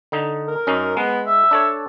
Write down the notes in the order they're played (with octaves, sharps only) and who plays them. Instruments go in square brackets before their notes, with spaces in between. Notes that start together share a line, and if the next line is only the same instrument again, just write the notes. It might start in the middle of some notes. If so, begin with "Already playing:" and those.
[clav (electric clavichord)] D3 D#4
[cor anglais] A#4
[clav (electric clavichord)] F#2 C#4 D#4
[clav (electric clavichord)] G#3 [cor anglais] B3
[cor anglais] E5
[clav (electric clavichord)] D4 A4 C#5